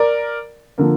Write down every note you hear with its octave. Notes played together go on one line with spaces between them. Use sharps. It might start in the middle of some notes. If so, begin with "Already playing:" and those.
Already playing: A#4 D5
D3 F3 A#3